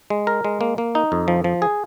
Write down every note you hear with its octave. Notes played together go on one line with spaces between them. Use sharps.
G#3
A#4
G#3
A#3
A#3
D#4
F2
F3
F3
G#4